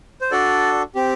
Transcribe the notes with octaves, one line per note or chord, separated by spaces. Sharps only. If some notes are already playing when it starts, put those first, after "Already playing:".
C5
D4 F#4 A4 D5
C4 G4